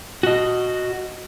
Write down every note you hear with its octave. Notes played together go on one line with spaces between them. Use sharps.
F#4 D#5